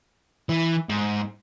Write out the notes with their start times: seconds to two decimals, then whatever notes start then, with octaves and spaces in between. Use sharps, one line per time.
0.49 E3
0.89 G#2